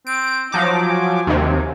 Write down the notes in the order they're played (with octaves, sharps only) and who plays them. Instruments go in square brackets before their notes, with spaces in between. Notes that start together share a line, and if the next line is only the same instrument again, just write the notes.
[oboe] C4 [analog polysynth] D7
[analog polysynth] F3 F#3 D6 [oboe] D#4
[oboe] G#5
[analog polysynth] D#2 C3